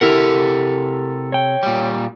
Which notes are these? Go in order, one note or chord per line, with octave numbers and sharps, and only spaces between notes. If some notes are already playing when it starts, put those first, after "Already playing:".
C3 E4 G4 A4 A#4 F#5
C#5 G5
A#2 G3